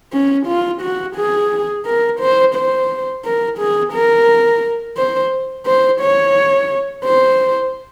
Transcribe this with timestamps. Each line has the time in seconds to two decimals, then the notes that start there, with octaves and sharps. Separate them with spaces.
0.13 C#4
0.47 F4
0.82 F#4
1.16 G#4
1.85 A#4
2.20 C5
2.55 C5
3.25 A#4
3.59 G#4
3.93 A#4
4.97 C5
5.66 C5
6.01 C#5
7.05 C5